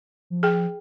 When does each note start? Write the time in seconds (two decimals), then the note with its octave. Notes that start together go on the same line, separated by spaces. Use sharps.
0.30 F3
0.43 G#4 G5